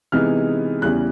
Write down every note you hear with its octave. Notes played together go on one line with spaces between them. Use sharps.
C3 E3 G#3 B3 D#4 F6
E2 C#3 E3 G3 B3 F#6